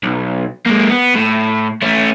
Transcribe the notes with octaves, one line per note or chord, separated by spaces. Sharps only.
B1
G#3 A#3
B3
A2
A3 C#4